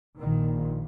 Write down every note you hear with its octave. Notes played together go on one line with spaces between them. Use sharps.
A#1 A#2 D#3